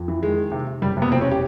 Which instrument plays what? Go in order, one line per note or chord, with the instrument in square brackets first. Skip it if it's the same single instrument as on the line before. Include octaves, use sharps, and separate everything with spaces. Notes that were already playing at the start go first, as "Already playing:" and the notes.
Already playing: [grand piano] F2
E3
D#3 G#3
D#3
C3
C3
F#1 G3
C3
B3
E1 C4
C#4
G4